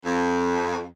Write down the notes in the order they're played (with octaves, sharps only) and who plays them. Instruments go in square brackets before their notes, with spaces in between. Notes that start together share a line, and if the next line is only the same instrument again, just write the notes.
[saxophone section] F2